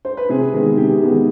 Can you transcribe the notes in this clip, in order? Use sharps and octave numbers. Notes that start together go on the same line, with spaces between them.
C5
B4
C3 G#4
D#3 G#3 B3
C3 G4
D#3 G#3 B3